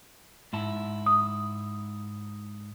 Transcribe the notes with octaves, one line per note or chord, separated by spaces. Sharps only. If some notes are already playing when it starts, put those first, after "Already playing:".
G#2 E4 A5
D#6